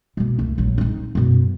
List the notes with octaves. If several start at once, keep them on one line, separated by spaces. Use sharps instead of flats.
B2 A#3
C2 A3
A#1 F#3
C4 D#4
F#2 B2